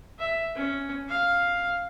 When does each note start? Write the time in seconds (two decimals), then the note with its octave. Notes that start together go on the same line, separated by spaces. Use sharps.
0.19 E5
0.56 C#4
1.09 F5